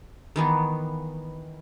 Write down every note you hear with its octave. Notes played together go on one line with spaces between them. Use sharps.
D#3 E3 B3